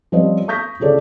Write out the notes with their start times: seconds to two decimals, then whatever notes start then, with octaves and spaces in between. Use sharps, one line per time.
0.12 F3 G3 C4 C#4 B4 D#5
0.48 C#6 D#6 G6 A#6 B6
0.80 D2 C#3 F4 G#4 A4 D5